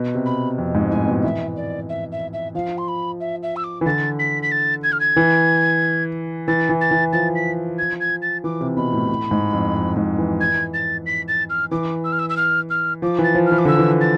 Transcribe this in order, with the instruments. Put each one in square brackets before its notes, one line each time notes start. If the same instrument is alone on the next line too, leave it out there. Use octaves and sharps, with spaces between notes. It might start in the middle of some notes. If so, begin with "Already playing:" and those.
Already playing: [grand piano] B2
C3
[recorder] B5
[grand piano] F2
G#2
[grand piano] A2 [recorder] G#5
[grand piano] B2
[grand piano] E3 [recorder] E5
[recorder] D5
E5
E5
E5
[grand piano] F3 [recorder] F5
[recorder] C6
B5
E5
E5
E6
D6
[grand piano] E3
[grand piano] D3 [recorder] A6
[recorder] B6
B6
A6
G#6
F6
G#6
[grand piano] E3
[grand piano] E3 [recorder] A6
[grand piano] E3
[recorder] A6
[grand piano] E3
[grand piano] F3 [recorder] A6
[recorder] B6
G#6
G#6
A6
[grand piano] E3 [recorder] D6
[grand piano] C3
[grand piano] B2 [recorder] B5
[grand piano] A2
A2
G#2
F2
F2
G#2
E3
[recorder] G#6
A6
B6
A6
F6
[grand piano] E3 [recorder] D6
[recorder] E6
F6
E6
E6
F6
F6
[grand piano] F3 [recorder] D6
[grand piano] E3 [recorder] A6
[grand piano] F3
[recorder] F6
[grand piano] E3
[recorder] D6
[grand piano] D3 [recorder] E6
[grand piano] E3
[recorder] A6